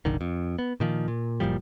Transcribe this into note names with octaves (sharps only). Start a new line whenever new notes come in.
F#1 B1 D3 D#3
F2
B3
A#2 D#3 F3
A#2
F#1 A#2 F3 G3